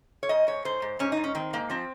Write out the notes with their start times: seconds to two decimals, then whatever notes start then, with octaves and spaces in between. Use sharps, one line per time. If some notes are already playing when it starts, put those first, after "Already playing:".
0.23 C#5
0.29 G#2 D#5
0.47 G#2 C#5
0.65 G#2 C5
0.82 G#2
0.99 G#2 C#4
1.12 G#2 D#4
1.24 C#4
1.35 D#3 C4
1.53 G#2 A#3
1.70 F3 C4